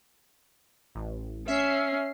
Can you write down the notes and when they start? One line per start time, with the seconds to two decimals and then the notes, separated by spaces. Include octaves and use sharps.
0.95 A1
1.48 C#4 E5 C7